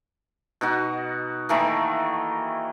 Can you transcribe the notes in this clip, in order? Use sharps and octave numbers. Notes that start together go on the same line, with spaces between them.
B2 D#4 F#4
D#3 E3 A3 A#3